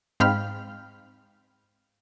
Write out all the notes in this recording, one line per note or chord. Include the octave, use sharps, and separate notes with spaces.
G#2 C4 F5 G5 B5 F6